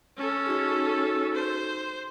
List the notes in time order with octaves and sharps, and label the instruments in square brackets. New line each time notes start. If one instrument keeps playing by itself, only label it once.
[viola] C#4 A4
[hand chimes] D#4 F#4 G#4
[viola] C5